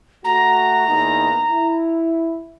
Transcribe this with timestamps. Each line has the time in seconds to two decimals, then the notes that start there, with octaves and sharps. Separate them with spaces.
0.24 A3 F#4 A#5
0.89 E2 A#3 D#4
1.51 E4